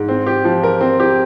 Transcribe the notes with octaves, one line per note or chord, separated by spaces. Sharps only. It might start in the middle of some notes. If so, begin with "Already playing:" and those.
Already playing: G#2
C4
G4
F3
A#4
C4
G4